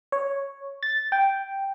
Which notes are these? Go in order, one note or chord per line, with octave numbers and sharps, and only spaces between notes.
C#5
A6
G5